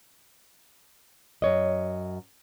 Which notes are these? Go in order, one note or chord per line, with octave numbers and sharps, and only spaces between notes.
F#2 C#5 D#5